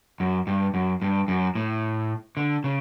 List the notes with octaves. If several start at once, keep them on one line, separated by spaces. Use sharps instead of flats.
F#2
G2
F#2
G2
F#2
A2
D3
C#3